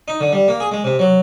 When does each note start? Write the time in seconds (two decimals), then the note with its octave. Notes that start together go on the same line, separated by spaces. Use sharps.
0.08 D#4
0.21 D3
0.32 G3
0.48 A#3
0.60 G#4
0.72 G#3
0.84 C3
0.99 F#3